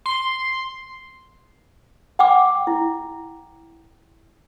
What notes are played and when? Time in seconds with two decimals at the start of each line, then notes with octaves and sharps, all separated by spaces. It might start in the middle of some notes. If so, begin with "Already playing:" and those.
0.06 C6
2.19 F#5 G5 D6
2.67 E4